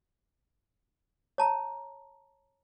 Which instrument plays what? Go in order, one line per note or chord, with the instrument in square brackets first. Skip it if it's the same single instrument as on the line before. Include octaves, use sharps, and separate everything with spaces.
[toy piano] C#5 A5 A#5